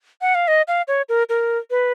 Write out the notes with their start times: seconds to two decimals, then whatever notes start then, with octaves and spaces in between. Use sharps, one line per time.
0.21 F#5
0.35 F5
0.48 D#5
0.68 F5
0.88 C#5
1.09 A#4
1.29 A#4
1.71 B4